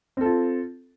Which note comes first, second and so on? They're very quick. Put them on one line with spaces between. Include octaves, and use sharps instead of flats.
C4 A4 F4